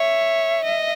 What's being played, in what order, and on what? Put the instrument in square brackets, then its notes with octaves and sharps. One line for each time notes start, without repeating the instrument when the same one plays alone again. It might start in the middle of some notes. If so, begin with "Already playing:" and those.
Already playing: [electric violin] C#5 [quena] E5
[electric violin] D#5